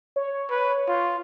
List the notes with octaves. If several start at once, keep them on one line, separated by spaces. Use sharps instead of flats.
C#5
B4
F4